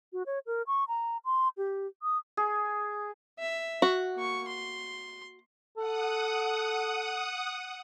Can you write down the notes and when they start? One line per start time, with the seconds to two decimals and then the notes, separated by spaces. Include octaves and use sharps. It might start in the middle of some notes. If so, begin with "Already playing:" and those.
0.13 F#4
0.26 C#5
0.47 A#4
0.67 C#6
0.88 A#5
1.25 C6
1.57 G4
2.03 D#6
2.37 G#4
3.39 E5
3.82 F#4
4.15 A#3 C#6
4.48 C6
5.77 A4 F#5 D#6